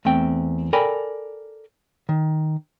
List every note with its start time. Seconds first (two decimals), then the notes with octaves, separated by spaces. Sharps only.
0.05 E2 A3 C4 G5
0.73 A4 A#4 D5 G5 G#5 B5
2.09 D#3